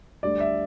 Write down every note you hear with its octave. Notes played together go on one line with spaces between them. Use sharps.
D2 D3 G3 D5
E5